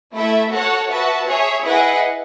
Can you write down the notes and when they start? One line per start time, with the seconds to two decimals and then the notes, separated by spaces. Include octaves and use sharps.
0.13 A3 E4 A4 E5
0.51 F#4 A4 C#5 F#5 A5
0.89 F#4 B4 E5 A5
1.27 G#4 C#5 E5
1.64 E4 G#4 B4 D#5 F#5